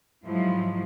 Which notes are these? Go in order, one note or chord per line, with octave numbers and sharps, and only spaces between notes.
G#2 F3 F#3 G#3 E4